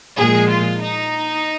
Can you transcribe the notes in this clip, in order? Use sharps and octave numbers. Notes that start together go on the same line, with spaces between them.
A#2 F3 G#3 G#4
F4
D#4